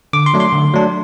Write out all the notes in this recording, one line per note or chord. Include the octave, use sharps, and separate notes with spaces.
D3 D6
C6
F#3 A3 D4
C6
D3
F#3 A3 D4